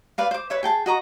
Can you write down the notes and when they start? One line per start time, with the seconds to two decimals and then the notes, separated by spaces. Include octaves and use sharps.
0.18 B4 D5 F5
0.31 C5 D6
0.50 B4 C#5 E5
0.63 G#4 G5 A5
0.86 F#4 D#5 A#5 C#6